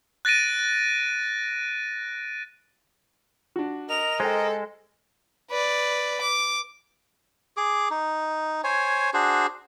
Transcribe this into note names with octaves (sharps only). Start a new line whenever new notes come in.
F#6 A6 A#6 D7 D#7
D4 F#4
A#4 D#5 F7
G#3 A4 C5 G5
B4 D5
D6
G#4 D6
D#4
C5 C#5 G#5
D4 F#4 G#4 C5